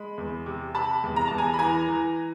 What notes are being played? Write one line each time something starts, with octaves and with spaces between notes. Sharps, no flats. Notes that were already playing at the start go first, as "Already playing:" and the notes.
Already playing: G#3 B5
E2
C3
C3 A5 B5
E2
A#5
E2 A5
G#5 A#5
B5
E3 G#5 A#5
E3